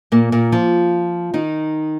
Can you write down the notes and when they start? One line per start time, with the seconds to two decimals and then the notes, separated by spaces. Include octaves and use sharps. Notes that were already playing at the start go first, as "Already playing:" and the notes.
0.12 A#2 A#3
0.32 A#2 A#3
0.52 F3 F4
1.34 D#3 D#4